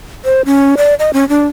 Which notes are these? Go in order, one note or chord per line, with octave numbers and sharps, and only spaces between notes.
C5
C#4
D5
D#5
C#4
D4